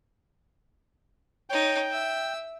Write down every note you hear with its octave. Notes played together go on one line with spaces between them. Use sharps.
D#4 C#5 G5
E5 E6